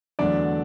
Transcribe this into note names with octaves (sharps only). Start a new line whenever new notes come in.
E2 D3 F#3 A3 D4 D5